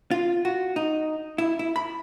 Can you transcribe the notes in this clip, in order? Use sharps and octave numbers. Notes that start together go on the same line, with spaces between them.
F4
F#4
D#4
E4
E4
B5